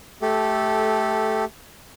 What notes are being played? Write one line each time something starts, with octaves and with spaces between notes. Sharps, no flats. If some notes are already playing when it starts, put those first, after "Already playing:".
A3 G4 A4